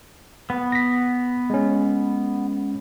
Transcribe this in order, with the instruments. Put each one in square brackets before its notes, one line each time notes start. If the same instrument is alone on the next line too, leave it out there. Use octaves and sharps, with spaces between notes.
[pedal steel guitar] B3
[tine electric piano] A#6 B6
G#3 C#4